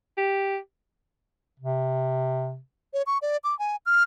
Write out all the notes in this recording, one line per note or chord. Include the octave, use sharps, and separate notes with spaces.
G4
C3
C#5
C#6
D5
D6
G#5
F6